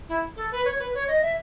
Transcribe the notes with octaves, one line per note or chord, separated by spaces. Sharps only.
E4
A4
B4
C#5
B4
C#5
D#5
E5